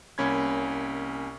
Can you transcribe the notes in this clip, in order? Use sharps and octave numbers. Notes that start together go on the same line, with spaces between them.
C2 A#3 C#4 B5 G#6